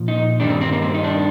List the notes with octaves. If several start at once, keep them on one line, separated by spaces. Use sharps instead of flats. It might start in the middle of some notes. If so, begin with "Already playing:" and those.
Already playing: A#2 F3
D#4
G2 D#3 G3 D4
C4
C4
A#3
C4
D#4
D4